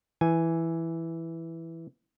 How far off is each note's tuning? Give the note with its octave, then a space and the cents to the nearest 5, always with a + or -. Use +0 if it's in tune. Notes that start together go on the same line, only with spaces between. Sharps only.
E3 +0 G#5 +0